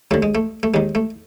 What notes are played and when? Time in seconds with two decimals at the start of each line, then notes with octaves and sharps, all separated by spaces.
0.11 D#2 D3 A3
0.23 G#3
0.35 A3
0.63 A3
0.74 D#2 D#3 G#3
0.95 A3